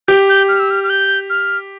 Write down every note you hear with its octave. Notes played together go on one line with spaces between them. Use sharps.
G4 G6
G6
F6
E6
F6
F6
G6
F6